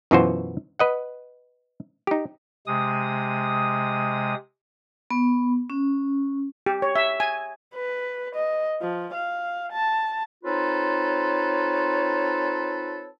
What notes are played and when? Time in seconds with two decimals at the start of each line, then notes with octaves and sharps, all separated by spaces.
0.11 F#2 B2 E3 F4 F#4 C5
0.79 B4 D#5 F#5
2.07 D#4 G4
2.67 C3 G#3 D#6
5.10 B3
5.70 C#4
6.66 G4
6.82 C#5
6.95 E5
7.20 G#5
7.75 B4
8.35 D#5
8.82 F3
9.13 F5
9.72 A5
10.44 C4 D#4 F4 A4 B4 C#5